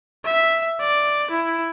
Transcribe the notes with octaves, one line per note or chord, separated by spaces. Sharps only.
E5
D5
E4